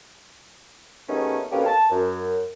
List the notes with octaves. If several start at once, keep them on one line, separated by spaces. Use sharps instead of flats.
D#2 A3 B3 C#4 D#4 G#4
F2 B2 A#3 C#4 G4 F5
A5
F#2